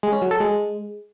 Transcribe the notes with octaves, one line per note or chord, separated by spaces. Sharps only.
G#3
C#4
F#3
A4
G#3